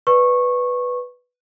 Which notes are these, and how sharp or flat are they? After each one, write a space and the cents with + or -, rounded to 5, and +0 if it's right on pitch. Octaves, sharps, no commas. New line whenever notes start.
B4 +0 D5 +0 C#6 -15